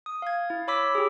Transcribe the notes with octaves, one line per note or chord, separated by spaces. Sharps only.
D#6
F5 G#6
E4
C#5 B5 D6 E6 B6
G4 G#4